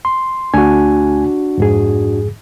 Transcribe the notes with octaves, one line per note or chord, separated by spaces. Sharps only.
C6
D2 A3 D4 F#4 G#5
F2 G#2 G#4